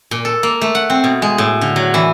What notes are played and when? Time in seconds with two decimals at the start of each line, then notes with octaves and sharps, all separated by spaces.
0.11 A#2
0.25 A4
0.43 A#3
0.61 A3
0.75 F#5
0.90 C4
1.04 B2
1.22 G#3
1.38 A2
1.61 D3
1.76 F#3
1.94 E3